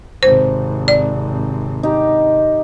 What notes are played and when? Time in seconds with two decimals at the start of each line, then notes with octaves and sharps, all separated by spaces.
0.23 G#1 C3 C5
0.88 D5
1.83 D#4 G4